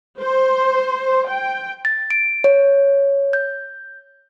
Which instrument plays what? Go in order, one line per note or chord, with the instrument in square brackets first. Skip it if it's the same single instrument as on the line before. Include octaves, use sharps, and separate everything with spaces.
[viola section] C5
G5
[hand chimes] A6
D7
C#5
G6